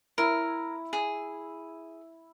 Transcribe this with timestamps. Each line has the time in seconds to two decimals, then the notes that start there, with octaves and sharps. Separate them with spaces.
0.18 E4 A#4
0.93 G#4